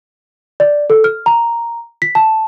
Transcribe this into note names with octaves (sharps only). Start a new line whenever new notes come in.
D5
A4
F6
A#5
B6
A5